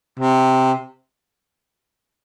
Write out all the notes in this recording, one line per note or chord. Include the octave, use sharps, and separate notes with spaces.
C3